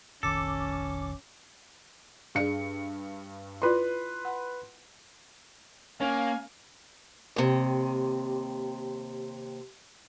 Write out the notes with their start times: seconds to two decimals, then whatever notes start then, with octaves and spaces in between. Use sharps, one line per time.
0.23 F1 A#1 D#3 C#4 A4 D6
2.35 G2 G#4 D5 F5 C#7
3.62 E4 F4 B4 D5 C6
4.25 F#5
6.00 A#3 C#4 F5 G#5
7.36 D#2 C3